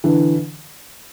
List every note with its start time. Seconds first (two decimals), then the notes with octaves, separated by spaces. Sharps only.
0.04 D3 E3